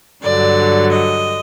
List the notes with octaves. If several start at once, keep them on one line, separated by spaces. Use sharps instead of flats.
G2 D3 F#3 D5
D#5